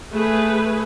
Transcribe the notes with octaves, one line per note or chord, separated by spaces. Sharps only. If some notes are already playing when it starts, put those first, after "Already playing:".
A3 G#4 B4